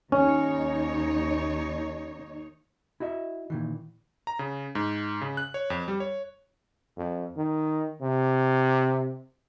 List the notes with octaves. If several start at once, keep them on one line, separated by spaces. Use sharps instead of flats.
D#2 C#4 D#4 C#5
E4 F#4 D#5 E5
A#2 D#3 E3
A#5
C#3
G#2
C#3
F#6
C#5
F2
G3
C#5
F2
D#3
C3